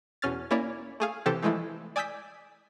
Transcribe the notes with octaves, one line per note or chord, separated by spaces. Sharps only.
E2 B2 C#4 F6 A6
A#3 C#4 E4 C#5 D5
A3 G#4 F5
C3 E3 G4 A4 C5
E3 F3 G#3 A3 E4
D5 G#5 D#6 E6 G6 B6